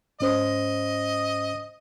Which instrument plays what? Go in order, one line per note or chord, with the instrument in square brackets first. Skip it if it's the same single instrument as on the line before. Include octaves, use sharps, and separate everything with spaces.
[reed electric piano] G#2 C#4 C5 [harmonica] D#5